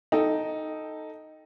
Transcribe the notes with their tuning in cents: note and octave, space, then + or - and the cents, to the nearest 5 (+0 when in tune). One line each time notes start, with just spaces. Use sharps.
D#4 +0 A4 +0 G5 +0